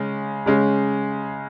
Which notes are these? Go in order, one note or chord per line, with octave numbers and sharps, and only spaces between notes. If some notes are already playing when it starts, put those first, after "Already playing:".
Already playing: C#3 G#3 C#4
C#3 G#3 C#4